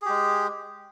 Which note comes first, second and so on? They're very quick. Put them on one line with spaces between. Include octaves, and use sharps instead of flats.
G#4 G4 G#3